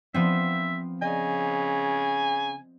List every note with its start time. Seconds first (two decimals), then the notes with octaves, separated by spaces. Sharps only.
0.14 F3 B3 C4 E5
1.02 C#3 D#5 G#5